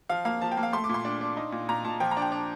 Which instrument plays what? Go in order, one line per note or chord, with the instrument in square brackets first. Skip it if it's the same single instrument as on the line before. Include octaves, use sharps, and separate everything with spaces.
[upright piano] F3 F5
A#3 F5
F3 A5
G5
A#3
F5
A3 C6
D6
A#2 C6
D4
D4
D#4
A#2
A#2 A#5
A#2 A5
F3 G5
A#5
D4
G5
D4